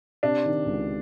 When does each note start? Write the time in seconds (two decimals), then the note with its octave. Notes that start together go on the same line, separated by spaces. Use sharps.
0.23 C3 D4
0.45 D#3
0.66 C#2